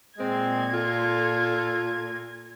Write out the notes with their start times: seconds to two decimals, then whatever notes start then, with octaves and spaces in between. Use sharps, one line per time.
0.19 A#2 G#3 C4 G#6
0.73 F4 A4